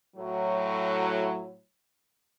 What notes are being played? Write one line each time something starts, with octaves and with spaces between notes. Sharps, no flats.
A2 F#3